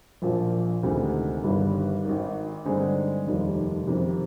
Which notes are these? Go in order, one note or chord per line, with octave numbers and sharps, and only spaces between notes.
A#1 A#2 F3
D2 C3 D#3 G#3
G1 G2 D#3 G3
G#1 G#2 D#3
G2 D3 G#3 C4 D#4
F1 D#2 D#3 G3
F2 C3 D#3